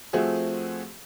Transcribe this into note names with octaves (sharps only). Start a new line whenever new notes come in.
F3 A3 C4 F#4 G#4